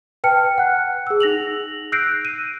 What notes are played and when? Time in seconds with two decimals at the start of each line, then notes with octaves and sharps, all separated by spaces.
0.24 B4 G5 A5 F6 C#7
0.58 F#5 F#6
1.07 G#4 E6
1.20 D#4 A#6 F7 F#7
1.92 E6 F#6 G6 A#6 C7 D7
2.25 D#7